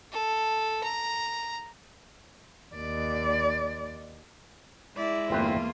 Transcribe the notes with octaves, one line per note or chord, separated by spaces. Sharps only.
A4
A#5
D#2 D5
G#3 E4 D5
G1 E2 A3 A#3 C4 F4 B4